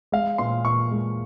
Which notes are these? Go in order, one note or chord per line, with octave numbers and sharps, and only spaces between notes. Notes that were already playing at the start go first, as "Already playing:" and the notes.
G#3 F5
A#2 C6
A#2 C#6
G#3